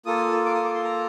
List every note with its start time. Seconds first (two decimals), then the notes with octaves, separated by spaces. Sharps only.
0.06 A#3 F4 A4 D#6
0.45 D6
0.55 D#6
0.65 D6
0.75 C6
0.84 A#5